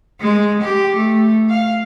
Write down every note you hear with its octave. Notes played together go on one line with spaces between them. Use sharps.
G#3
G4
A3
F5